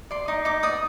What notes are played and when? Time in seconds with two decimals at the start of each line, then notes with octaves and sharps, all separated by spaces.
0.11 D5 C6
0.28 D#4 D#6
0.45 D#4 D6
0.63 D5 D#6